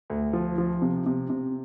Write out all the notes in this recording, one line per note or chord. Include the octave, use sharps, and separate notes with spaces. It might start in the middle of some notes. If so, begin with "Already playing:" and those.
D2
F3
F3
C3
C3
C3